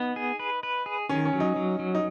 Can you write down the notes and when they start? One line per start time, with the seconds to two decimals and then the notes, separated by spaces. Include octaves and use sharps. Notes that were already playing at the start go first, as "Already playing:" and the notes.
Already playing: B3 D#4
0.16 G#4
0.39 B4
0.63 B4
0.86 G#4
1.09 D#3 C#4
1.25 C#4
1.33 F#3
1.40 D#4
1.56 F#3
1.79 F#3
1.95 D#4